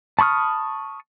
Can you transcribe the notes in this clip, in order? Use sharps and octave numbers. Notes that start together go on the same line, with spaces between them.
A5 B5 C#6 D#6 F6